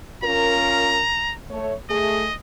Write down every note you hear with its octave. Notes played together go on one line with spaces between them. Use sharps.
C#4 F4 A#4 A#5
A3 C#5
A3 G#4 D#5